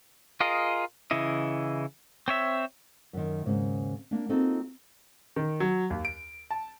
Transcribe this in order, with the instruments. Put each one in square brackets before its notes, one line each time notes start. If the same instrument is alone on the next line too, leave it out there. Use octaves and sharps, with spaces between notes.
[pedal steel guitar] F4 G#4 A#4 D#5
C#3 E3 E4 D#5
C4 C#5 E5
[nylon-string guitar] F#2 D#3
D#2 G#2 C#3
A#3 D4
C4 D#4 F4 F#4 A4
[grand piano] D#3
F#3
D#2
D7
A5